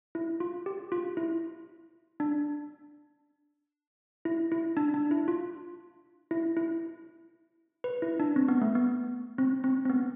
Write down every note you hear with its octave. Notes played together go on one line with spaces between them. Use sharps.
E4
F4
G4
F4
E4
D4
E4
E4
D4
D4
E4
F4
E4
E4
B4
E4
D4
C4
B3
A3
B3
C4
C4
C4
B3